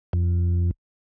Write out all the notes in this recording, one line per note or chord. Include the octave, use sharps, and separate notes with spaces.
F2